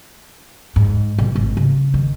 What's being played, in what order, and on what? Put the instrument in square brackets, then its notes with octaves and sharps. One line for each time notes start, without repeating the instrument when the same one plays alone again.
[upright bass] G#2
B1
G#1
C#3
D#3